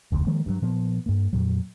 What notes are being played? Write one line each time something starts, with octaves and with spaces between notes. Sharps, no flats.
F1 D2
D#3 F3 G#3 A#3
G2 E3 F#3
A#2 F3 B3
G2 A#3
F2 A#2 F#3